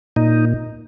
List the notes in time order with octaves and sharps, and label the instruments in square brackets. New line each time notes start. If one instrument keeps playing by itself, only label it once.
[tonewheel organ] A#2 D#4